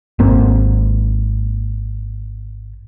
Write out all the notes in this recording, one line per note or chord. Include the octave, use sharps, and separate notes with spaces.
G#1 G#2 A#3 C4